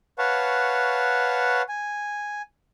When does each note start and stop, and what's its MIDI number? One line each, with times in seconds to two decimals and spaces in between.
0.19 1.62 71
0.19 1.62 73
0.19 1.62 77
0.19 1.62 78
0.19 1.62 81
0.19 1.62 85
1.69 2.42 80